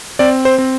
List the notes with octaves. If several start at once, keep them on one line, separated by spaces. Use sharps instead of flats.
C4 D5
C5
C4